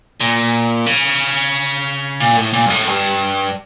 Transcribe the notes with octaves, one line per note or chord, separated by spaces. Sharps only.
A#2
C#3
A#2
A2
A#2
G2
A2
G2